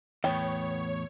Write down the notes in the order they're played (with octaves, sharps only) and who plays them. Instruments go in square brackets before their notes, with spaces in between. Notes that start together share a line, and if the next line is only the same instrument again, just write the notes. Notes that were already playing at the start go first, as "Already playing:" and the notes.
[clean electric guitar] E2 A2 [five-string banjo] B3 G5 [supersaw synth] C#5